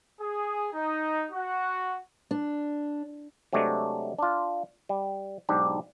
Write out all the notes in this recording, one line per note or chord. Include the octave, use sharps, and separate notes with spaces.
G#4
D#4
F#4
D4
C3 F#3 G#3 A3 D4
D4 F4
G3
B1 G#2 D4 G4